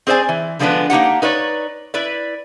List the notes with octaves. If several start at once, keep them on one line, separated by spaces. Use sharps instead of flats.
C4 G#4 C5 D5 G#5
E3
D3 F3 G#3 B3 D4 B4
A#3 D#4 G4 F#5
D#4 B4 C#5 D5
E4 B4 D5